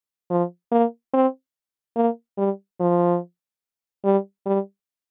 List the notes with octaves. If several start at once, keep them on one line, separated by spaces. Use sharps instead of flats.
F3
A#3
C4
A#3
G3
F3
G3
G3